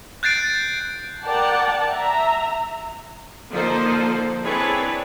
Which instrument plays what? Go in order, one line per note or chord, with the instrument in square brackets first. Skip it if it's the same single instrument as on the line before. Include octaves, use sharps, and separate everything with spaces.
[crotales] F#6 G6 A6 C7 D7
[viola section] A#4 D5 F#5 G5 A5
E5 A#5
D3 F3 A#3 D#4 A4 C5
C4 D4 E4 G#4 B4 C#5